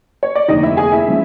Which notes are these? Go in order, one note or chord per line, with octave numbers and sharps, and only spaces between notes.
C#5
D5
F1 D#2 D3 D#4 D#5
E4 E5
G#4 G#5
E4 E5
C#3 F3 G#3